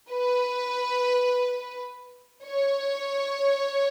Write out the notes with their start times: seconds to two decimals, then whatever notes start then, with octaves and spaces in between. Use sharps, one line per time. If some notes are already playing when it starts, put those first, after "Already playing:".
0.10 B4
2.43 C#5